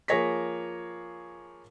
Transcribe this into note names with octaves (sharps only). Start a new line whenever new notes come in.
F3 A#3 G#4 C#5 A#6 B6